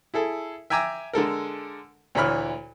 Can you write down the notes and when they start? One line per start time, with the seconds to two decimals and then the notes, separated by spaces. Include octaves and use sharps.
0.14 E4 G#4 A4
0.70 E5 G5 G#5 A#5 D6 E6
1.13 D3 G#3 A4 A#4
2.15 D2 A#2 E3 C#5 B5 F6